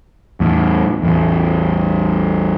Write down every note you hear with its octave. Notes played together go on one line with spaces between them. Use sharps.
E2 A2
A1 E2